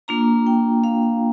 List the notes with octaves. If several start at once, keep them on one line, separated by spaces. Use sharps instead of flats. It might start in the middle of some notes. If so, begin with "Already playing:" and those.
A#3 D4 F4 A#5
G5
F5